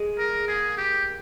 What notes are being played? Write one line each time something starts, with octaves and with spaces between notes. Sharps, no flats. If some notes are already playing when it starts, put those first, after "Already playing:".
Already playing: G#3 G#4
A#4
A#3 G#4 A#4
G4